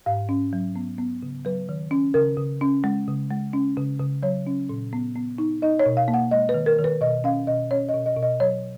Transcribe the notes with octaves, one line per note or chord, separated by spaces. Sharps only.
G#2 F5
C#4
F#3
B3
B3
C#3
F#3 B4
D#3
C#4
C#3 A#4
C#3
C#4
G#3
C#3
G#3
C#4
C#3
C#3
F#3 C#5
C#4
A#2
B3
B3
D#4
D#4 D#5
C#5
B2
F5
A#3
F#5
G#3 D#5
B4
D#3
A#4
D#3
B4
B2 D#5
C#4 F5
B2 D#5
C#4 C#5
D#5
B2
D#5
B2
D#5
F#3 C#5